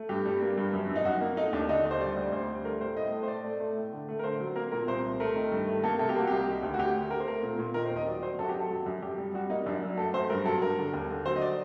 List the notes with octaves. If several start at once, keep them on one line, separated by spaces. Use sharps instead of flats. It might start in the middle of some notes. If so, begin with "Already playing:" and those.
Already playing: A3
G2 G4
G3
A#3
G2
F#2
F#2
D#4
F#2 F#4
A#3
A3 D#4
D#2 D4
D3 D#4
D#2
C5
G3 D5
D2
D2 C5
G3
A3 A#4
A2 C5
A2 D#5
A3
C5
A3 D5
A3
A3
A2
D3
A3
A#4
D3 C5
F#3
A#3 A#4
A#2 A#4
C2 C5
C2
A3 A#4
D#3
G2
A3
A#3 A4
C3 A4
G4
A#3 F#4
C2 G4
D#3
D2
F#4
D2 G4
D2
A3 A#4
C5
A3 A#4
A#2
A#2
D#3 A#4
C5
D#2
D#5
F#3 D5
F#3 C5
F#2 A4
F#4
G4
F#2
A4
F#3
F#2
F#2 G4
G3
G3 F#4
A#3 D#4
F#2 D4
F#3
A3 A4
F#2 C5
G2 A#4
F#3 A4
G2 A#4
D3
D#2
D3
F#3 C5
D#5
D5